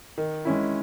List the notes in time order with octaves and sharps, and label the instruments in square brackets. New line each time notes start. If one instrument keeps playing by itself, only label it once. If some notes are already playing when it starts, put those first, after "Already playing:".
[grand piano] D#3
G#3 C#4 E4